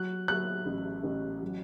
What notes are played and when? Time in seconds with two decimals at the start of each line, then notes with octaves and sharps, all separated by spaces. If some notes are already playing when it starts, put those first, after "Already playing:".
Already playing: F#3 F#6
0.28 F#3 F#6
0.66 A1
1.03 A1
1.42 F#3